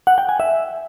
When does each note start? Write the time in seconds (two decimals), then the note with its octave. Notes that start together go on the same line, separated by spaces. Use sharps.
0.07 F#5
0.18 G5
0.29 G#5
0.40 E5